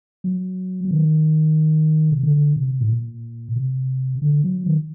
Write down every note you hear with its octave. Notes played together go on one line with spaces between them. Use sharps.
F#3
F#3
D#3
C3
D3
C3
A2
A#2
C3
D3
F#3
D#3